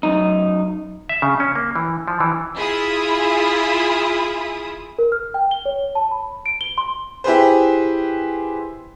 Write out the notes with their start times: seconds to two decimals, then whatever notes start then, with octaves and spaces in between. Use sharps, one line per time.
0.03 F#2 D#4
1.09 E5
1.22 C#3
1.40 C#4
1.55 A#3
1.75 E3
2.08 F3
2.20 E3
2.54 E4 F4 G#4 E5 D#6
4.99 A#4
5.12 F6
5.34 G5
5.51 G7
5.65 C#5
5.95 A5
6.11 B5
6.46 D7
6.61 G7
6.78 C6
7.24 E4 G4 G#4 B4 C5